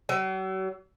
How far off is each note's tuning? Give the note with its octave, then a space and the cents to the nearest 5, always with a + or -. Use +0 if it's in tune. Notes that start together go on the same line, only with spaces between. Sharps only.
F#3 +40